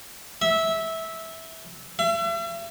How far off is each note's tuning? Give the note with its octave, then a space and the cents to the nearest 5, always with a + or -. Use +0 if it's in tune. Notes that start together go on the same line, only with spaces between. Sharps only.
E5 -15
E5 +40